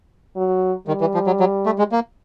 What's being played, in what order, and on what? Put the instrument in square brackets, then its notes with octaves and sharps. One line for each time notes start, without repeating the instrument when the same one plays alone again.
[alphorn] F#3
[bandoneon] D#3 [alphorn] G3
[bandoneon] E3
F3
F#3
F#3
A3
G#3
A#3